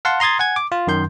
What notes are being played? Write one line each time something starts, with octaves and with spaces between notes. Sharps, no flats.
F5 F#5 A5 C6
A#5 C6 D#6 G#6 A6
F#5 G#5 G#6
D6
F4
F#2 D#3 C6 G6